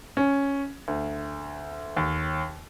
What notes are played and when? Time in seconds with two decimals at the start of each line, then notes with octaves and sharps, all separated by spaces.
0.17 C#4
0.88 D2
1.97 D#2